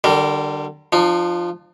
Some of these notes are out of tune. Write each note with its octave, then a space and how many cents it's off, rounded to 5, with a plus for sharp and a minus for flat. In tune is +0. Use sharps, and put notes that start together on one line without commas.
D3 +25 G3 -20 A#4 +0
F3 +0 D4 +45